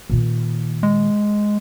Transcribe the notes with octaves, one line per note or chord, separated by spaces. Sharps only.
A#2 D#3
G#3